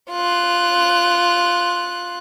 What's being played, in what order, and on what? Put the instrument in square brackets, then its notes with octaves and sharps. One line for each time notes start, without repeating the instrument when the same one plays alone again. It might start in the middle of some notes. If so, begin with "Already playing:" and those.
[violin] F4 F#6